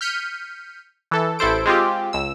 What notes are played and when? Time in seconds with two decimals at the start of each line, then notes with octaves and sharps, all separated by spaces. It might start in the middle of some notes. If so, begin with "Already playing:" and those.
0.01 F6 G6 B6 C#7 D#7
1.11 E3 A4
1.39 A1 E4 A4 C5 D7
1.66 G#3 C4 F4 G4
2.13 C#2 E6